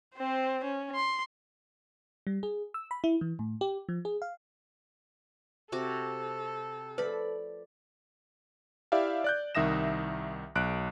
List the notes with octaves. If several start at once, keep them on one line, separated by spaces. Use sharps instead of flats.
C4 C5
C#4
C6
G3
G#4
E6
B5
E4
E3
A2
G4
F3
G#4
F5
C3 F#4 A4 D6
F3 A3 B4 D5 B5
E4 G4 D5 E5 F5
D5 F#6 G6
C2 D#3 E5 D#6 A#6 E7
B1 F#6 D7